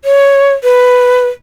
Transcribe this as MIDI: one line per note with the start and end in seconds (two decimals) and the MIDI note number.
0.05 0.54 73
0.64 1.27 71